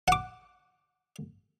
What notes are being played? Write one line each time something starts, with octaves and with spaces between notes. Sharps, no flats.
F#5 D6